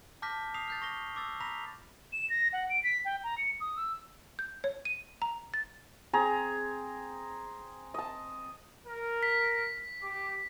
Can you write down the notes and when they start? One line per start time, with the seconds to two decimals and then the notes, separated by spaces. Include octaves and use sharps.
0.22 A5 D6 F6 G6 A#6 B6
0.54 D#6 C7 F7
0.68 F6 G6 A6
0.82 C#6 A#6 G7
1.16 D6 E6 A6
1.40 A#5 B5 A#6 B6 F7
2.13 E7
2.30 A#6
2.53 F#5
2.70 D7
2.84 B6
3.05 G5
3.24 A#5
3.38 C#7
3.60 D#6
3.77 E6
4.39 G6
4.64 C#5
4.85 D#7
5.22 A#5
5.54 A6
6.13 C4 G#4 A#5
7.94 D#5 A5
8.87 A#4
9.23 B6
10.03 G4 D6